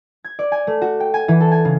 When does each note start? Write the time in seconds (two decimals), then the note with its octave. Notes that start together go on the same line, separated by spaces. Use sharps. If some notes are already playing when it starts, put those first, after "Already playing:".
0.25 G#6
0.39 D5
0.52 G#5
0.67 A3
0.82 F#4
1.00 G5
1.14 G#5
1.28 E3
1.40 A4
1.52 G#5
1.65 C#3